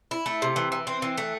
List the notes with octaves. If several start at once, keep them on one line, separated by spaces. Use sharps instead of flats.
E4
A3
C3
E3
E3
C4
E3
A3